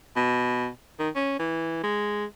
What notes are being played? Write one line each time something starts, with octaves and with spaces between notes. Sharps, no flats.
B2
D#3
C#4
E3
G#3